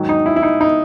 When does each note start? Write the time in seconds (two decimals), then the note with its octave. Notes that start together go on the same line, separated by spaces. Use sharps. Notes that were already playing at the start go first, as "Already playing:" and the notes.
Already playing: G#2 D#3 F#3
0.09 D#4
0.26 E4
0.36 E4
0.43 D#4
0.61 D#4